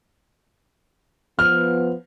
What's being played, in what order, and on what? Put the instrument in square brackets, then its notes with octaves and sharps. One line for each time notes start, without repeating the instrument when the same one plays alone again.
[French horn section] F3 B3 [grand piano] F6